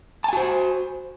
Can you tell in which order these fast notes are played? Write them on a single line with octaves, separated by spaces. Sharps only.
A5 G#5 F#4 C5